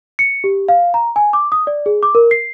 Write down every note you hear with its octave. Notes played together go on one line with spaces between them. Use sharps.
C#7
G4
F5
A#5
G#5
D6
D#6
D5
G#4
D6
A#4
C7